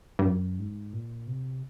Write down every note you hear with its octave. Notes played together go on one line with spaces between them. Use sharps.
G2
F#2
G#2
A#2
C3